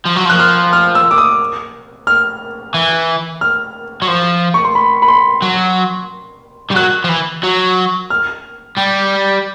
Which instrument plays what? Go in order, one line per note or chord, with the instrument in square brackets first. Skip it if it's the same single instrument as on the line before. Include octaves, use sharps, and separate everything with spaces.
[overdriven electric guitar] F3
F#3
[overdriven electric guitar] F3 [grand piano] F#6
[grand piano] F6
F6
E6
D6
D#6
F6
[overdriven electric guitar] E3
[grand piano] F6
[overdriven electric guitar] F#3
F3
[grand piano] C#6
C6
B5
B5
C6
[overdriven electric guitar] F#3
G3
[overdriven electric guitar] F#3 [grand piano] F#6
[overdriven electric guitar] F3
E3
F#3
[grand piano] F6
[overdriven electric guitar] G3